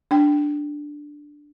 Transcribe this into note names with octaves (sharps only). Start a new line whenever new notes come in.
D4 G5